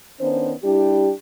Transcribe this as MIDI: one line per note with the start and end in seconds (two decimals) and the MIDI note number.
0.20 0.52 51
0.20 0.52 59
0.20 0.52 61
0.20 0.52 62
0.20 0.52 72
0.63 1.11 55
0.63 1.11 62
0.63 1.11 64
0.63 1.11 67